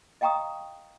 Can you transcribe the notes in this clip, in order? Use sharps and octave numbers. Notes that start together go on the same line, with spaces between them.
D#5 F5 G5 A#5 C#6 D#6